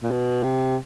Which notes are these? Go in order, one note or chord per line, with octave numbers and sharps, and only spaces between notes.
A#2
B2
C3